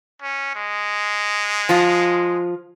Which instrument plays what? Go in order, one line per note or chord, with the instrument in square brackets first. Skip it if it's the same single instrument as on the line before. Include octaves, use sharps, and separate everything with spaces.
[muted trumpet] C#4
G#3
[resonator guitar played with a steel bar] F3 F4